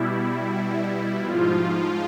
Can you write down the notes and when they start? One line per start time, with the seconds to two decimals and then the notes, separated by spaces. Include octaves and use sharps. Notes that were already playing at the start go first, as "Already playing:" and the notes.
Already playing: B2 G3 E4
1.17 G#2 F3 F4